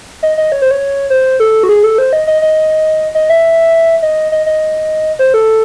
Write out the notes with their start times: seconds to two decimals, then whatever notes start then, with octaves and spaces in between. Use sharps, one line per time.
0.23 D#5
0.38 D#5
0.52 C#5
0.62 C5
0.71 C#5
1.10 C5
1.40 A4
1.63 F#4
1.69 G#4
1.83 A4
1.98 C5
2.13 D#5
2.27 D#5
2.42 D#5
3.15 D#5
3.30 E5
4.02 D#5
4.32 D#5
4.46 D#5
5.19 C5
5.34 A4